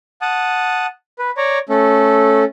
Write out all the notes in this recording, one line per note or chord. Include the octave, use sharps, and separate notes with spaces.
F#5 A5 D#6
B4
C#5 D5 A#5
A3 C#4 A4